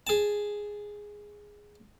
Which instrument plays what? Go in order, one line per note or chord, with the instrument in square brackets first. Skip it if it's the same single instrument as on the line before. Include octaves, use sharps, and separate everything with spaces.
[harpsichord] G#4 A5